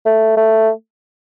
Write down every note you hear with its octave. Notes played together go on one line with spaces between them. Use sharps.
A3
A3